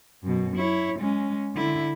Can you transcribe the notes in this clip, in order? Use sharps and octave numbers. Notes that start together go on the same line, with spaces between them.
F#2 B2
E4 C#5
G#3 C#4
D3 E4